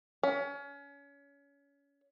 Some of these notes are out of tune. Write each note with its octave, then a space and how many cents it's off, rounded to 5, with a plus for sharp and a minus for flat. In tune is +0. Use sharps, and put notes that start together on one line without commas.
C#4 +30